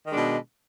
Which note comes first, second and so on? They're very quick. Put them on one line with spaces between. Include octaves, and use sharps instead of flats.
D#3 G#3 D4 B2